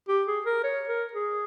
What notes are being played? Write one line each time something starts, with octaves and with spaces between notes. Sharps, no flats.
G4
G#4
A#4
C#5
A#4
G#4